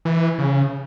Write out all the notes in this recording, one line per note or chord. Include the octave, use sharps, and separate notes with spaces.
E3
C#3